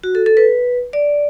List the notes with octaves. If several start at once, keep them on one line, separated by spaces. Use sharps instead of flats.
F#4
A4
A4
B4
D5